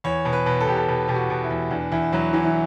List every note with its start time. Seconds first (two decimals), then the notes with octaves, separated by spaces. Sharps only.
0.04 E2 C#5
0.25 B2
0.33 B4
0.46 B2
0.60 A4
0.67 B2 G4
0.77 A4
0.88 B2
1.08 B2 G4
1.15 F#4
1.30 B2
1.43 E4
1.50 E2
1.71 E2 D4
1.91 E2 E4
2.13 E2 F#3
2.33 E2 E3
2.44 E3